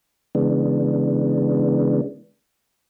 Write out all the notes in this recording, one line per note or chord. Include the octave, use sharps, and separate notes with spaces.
C#3 E3 G#3 B3 D4